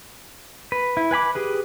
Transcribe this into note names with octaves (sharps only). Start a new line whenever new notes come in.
B4
E4
B4 G#5 B5 D6
G4 G#4 B4